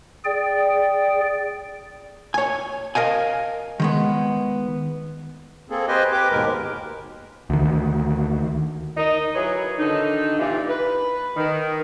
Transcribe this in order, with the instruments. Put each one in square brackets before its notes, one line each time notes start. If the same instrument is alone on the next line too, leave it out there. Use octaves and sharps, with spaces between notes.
[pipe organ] G#4 D5 G5
[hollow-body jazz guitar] C#5 G#5
A#4 D#5 F5 G#5
D#3 G#3 B3
[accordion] A#3 C4 G#4 A4
G4 B4 C5 D#5 G5 G#5
G4 B4 D6
D#2 G#2 B2 G#3 A#4
[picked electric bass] D2 D#3
[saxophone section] D#4 A#4 D#5
F#3 E4 G#4 B4 C#5
D3 D#3 D#4
A#2 E3 D4 E4 F4 G4
B4
D#3